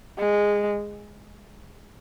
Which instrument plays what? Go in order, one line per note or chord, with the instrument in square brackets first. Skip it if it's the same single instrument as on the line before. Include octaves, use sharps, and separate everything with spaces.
[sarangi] G#3